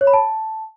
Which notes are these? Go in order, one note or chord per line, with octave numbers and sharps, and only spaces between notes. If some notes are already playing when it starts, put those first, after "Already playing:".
C#5
B5
A5